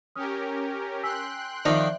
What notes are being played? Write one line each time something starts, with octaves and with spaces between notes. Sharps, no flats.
C#4 G4 A#4 D#6 F6
G5 G#5 C6 E6 F#6 B6
D#3 F3 C4 D4 D5 E5